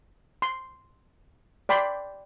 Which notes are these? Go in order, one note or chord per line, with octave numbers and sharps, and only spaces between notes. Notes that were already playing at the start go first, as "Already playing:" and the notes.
C6
D5 G5 B5 C6